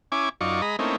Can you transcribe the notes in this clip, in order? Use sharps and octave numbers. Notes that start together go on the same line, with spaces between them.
C#4 E4 G#5 D6
F#2 D#4 F4 D5 C#6
G#3 D#5 A#5 B5
A3 A#3 C4 C#4 D#4 E4